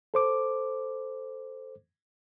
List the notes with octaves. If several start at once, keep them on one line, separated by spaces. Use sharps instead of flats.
A4 C5 D6